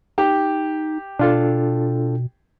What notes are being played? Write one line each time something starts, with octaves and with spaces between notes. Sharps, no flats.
D#4 G4
B2 D4 F4 A4